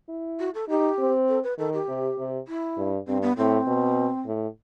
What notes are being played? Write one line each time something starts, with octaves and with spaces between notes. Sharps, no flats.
E4
F#4
A4
D#4 G4
C4
A4
B4
D#3 A4
G4
C3
C3
E4
G2
G2 C4
B3
A2 C4
B2
A2